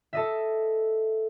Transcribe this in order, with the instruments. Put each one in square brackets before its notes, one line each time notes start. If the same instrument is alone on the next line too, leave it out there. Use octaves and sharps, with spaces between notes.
[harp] A4 D#5 E5